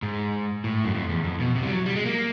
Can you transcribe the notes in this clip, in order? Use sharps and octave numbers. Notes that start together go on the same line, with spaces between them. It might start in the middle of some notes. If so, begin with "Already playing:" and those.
G#2
A2
F#2
F2
E2
F2
B2
C3
G3
F#3
G3
G#3
A#3